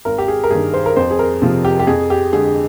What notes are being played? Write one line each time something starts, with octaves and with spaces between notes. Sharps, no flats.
G#1 A#4
G4
G#4
A#4
G2 D#3 G#4
C5
A#4
F2 C5
G#4
A#4
C3 F3
G4
G4
F2 G#4
G4
D3 G#3 G#4